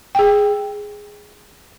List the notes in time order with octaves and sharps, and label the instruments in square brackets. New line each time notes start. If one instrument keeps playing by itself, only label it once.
[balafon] G#4 G5